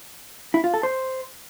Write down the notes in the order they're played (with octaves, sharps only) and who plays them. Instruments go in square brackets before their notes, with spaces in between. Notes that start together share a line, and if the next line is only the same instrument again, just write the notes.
[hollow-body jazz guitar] E4
F4
A4
C5